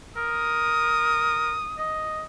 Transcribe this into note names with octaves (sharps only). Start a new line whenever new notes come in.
A#4 D#6
D#5